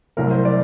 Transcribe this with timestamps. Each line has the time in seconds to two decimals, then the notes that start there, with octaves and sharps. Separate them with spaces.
0.17 C2 C3 F#3 A3 C4 A#4
0.31 C5
0.45 D5